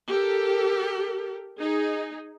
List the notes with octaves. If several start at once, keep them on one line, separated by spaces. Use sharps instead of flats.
G4 A4 A#4
D#4 G#4